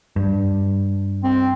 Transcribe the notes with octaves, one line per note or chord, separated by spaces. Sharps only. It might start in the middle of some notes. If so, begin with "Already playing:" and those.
G2
C4